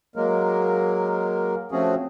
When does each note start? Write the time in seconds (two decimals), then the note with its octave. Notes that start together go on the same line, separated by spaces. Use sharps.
0.16 F#3 G#3 A#3 A#4
1.72 F3 A3 C4 C#4 F#4 G#4